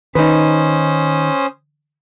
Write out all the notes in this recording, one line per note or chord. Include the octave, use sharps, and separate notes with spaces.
D#3 C#4 D#4 B4 C5 D#6